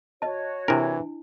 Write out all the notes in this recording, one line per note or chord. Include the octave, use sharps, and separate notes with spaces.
F#4 C#5 D#5 A5
C3 E3 D4 E4 A#4